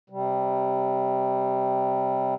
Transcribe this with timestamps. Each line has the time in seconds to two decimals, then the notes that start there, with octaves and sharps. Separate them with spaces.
0.10 C3 G3